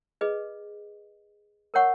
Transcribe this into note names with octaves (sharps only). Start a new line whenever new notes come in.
G#4 B4 D#5
A#4 C#5 F#5 C#6